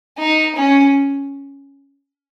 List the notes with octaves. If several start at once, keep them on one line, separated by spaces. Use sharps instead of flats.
D#4
C#4